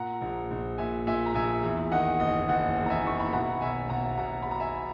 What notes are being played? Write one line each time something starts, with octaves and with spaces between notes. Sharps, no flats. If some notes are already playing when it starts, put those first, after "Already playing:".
Already playing: A#2 F#5 A#5
A#1
A#1
A#2 E5 G#5
A#2 E5 G#5
A#5
A#1 E5 G#5
E2
D#3 D#5 F#5
F#1 D#5
F#1 D#5 F#5
E2
A#5
E5 G#5
D#3 C#6
B5
B2 F#5 A#5
B1 E5 G#5
B1 F#5 A#5
B2 F#5 A#5
B2 B5
A#5
E5 G#5